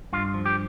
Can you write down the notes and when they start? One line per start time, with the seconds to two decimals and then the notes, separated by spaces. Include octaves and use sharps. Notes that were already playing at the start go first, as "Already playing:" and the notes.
0.13 G2 F4
0.34 F3
0.46 G4